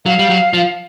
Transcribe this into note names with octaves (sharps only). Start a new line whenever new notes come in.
F#3 F5
G3
F#3
F3